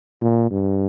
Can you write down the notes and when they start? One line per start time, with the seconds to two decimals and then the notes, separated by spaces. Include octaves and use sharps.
0.22 A#2
0.51 G2